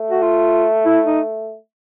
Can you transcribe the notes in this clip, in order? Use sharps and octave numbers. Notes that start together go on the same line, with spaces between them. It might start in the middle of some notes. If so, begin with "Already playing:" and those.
Already playing: A3
F#4
F4
E4
D#4